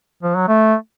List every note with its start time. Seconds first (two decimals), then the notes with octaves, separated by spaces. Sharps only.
0.23 F3
0.36 F#3
0.48 A3